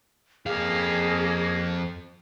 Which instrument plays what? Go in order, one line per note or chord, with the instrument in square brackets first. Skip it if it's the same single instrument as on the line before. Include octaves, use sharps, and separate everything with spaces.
[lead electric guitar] F2 F5 [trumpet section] A#3 C#4 [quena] G#4